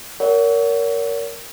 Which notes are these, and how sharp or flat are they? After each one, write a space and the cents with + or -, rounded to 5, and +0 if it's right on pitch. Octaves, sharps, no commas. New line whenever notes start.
A#4 +0 C#5 +35 F#5 +0